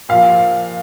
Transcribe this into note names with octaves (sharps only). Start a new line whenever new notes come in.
A#2 F3 F5